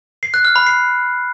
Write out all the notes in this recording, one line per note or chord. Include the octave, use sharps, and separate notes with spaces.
C7
F#6
F6
B5
C7